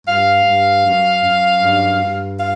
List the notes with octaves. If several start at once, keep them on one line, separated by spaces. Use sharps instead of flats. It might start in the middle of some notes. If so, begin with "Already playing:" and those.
G2 F5
G2
F#2
F#2
G2
G2
F5